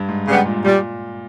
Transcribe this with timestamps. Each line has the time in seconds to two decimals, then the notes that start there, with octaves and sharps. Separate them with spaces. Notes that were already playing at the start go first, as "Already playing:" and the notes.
Already playing: G2
0.09 G#2
0.27 G#2 C#3 G3 B3 G4
0.45 A#2
0.64 A#2 G3